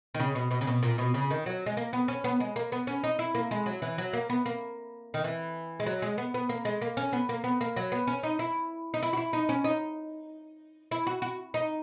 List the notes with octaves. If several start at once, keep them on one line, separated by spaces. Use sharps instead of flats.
D#3
C#3
B2
B2
C#3
B2
A#2
B2
C#3
D#3
F#3
G#3
A#3
B3
C#4
B3
G#3
A#3
B3
C#4
D#4
E4
A#3
G#3
F#3
E3
F#3
A#3
B3
A#3
D#3
E3
G#3
F#3
G#3
B3
B3
A#3
G#3
A#3
C#4
B3
A#3
B3
A#3
F#3
B3
C#4
D#4
E4
D#4
E4
F#4
E4
D#4
C#4
D#4
E4
F#4
F#4
D#4